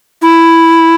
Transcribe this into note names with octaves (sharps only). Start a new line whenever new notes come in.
E4